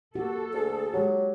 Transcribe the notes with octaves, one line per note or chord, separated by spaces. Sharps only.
A#3 F#4 G4 A4
D2 G#4
F#3 G#3 G4